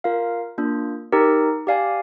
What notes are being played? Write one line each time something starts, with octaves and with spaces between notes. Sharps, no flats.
F4 A#4 F5
A#3 D4 F4
D#4 G4 A#4
G4 D5 F5 G#5